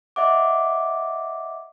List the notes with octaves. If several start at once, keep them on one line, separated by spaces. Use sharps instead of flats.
D#5 E5 F#5 D6